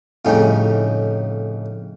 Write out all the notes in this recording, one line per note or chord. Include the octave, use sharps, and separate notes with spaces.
F2 A2 C#3 G3 C#4 D#4